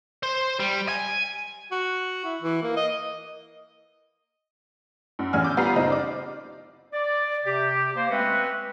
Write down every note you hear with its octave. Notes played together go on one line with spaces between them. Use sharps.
C5
G3
G#5
F#4
E4
E3
A#3
D#5
F#2
A1 E2 D4 G#5 E6 F6
D6 E6 G6
G3 B3 F4 A#5 B5 C7
F#1 C4 D#4
D5 D6
D5
C3 G4
A#3 C5
G#3 A3 C4 C#4 F#4 B4